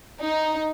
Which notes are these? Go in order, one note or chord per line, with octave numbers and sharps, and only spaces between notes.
D#4